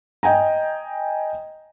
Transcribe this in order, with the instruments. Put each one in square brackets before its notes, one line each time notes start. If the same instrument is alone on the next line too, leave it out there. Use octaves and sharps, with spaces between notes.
[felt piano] D#5 G5 G#5 A#5